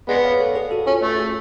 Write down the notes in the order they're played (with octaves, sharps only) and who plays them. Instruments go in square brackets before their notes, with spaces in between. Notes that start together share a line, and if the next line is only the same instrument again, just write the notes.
[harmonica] G#3 B3 [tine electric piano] D5 F#5
[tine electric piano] C#5 F5
A4 C#5
G#4 B4
F#4 A4
[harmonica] C#4 [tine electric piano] F4 G#4
[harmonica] A3
[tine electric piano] F#4 A4